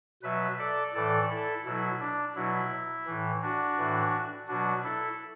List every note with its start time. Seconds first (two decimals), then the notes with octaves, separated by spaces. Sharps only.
0.23 B2 F#3 B4 E5
0.58 A4 D5
0.94 A2 E3 A4 D5
1.29 E4 A4
1.65 B2 F#3 E4
2.00 D4
2.36 B2 F#3 E4
3.06 A2 E3
3.42 D4 F#4
3.77 A2 E3
4.48 B2 F#3 D4 F#4
4.84 E4 A4